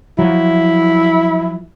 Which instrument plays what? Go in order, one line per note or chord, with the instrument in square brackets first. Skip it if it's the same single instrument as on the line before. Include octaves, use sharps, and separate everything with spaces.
[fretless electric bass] F3 F#3 [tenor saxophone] E4